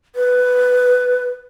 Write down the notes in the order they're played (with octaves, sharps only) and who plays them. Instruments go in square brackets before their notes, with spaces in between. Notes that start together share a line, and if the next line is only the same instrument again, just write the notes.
[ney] B4